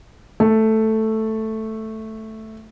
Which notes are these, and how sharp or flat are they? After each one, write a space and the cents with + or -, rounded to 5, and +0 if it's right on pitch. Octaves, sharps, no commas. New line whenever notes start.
A3 +0 A4 +0